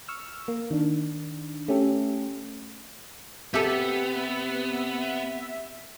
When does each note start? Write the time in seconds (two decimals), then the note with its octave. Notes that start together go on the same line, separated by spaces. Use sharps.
0.08 C#6 E6 F6
0.48 A#3
0.71 D#3 D4
1.68 A3 C#4 G4 A4
3.54 C3 B3 G4 A4 E5